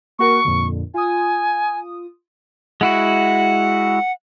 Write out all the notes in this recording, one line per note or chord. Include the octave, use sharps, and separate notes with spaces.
A#3 F#4 A#4 C#6
F2 A#2 D3
F4 G#5 D#6
G#3 E4 F#4 F#5